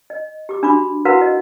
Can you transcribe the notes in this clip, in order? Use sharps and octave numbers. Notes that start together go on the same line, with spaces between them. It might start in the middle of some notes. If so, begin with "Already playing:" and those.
D#5
G4 D6
D4 F#4 B5 D6
E4 F#4 A#4 B4 F5 F#5
D#5